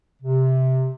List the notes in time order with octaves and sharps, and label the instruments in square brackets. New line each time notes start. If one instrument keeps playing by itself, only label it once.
[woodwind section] C3